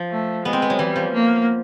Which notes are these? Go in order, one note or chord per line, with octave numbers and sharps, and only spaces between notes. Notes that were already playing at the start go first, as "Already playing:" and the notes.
Already playing: F3
A3
G#3 B3
C4
B3
F#3
E3 G3
F3
A#3